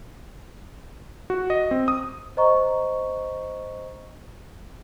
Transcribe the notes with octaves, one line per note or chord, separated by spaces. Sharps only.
F#4
D#5
C4
D#6
C5 D#5 A#5 C#6